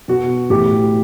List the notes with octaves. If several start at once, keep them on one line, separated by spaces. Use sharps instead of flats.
B2 F#4
A2 E3 G4